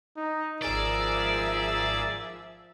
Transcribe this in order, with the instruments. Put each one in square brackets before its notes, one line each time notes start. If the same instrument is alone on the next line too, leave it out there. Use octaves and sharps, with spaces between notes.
[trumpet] D#4
[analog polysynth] G#1 G#4 E6 [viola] F3 E5 [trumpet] A#4 [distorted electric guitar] D5